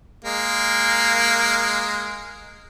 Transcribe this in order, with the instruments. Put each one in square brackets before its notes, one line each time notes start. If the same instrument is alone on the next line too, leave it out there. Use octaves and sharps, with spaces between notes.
[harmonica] G#3 A#3